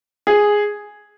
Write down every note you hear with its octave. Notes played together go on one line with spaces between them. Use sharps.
G#4